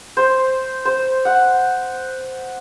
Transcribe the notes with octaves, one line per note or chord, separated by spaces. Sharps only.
C5
C5
F#5